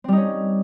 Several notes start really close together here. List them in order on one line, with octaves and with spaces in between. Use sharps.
C4 G3 D#4 C#4